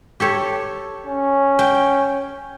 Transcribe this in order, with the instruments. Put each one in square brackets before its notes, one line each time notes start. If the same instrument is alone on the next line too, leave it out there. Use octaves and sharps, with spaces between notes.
[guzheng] G4 A4 C#5
[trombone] C#4
[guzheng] G5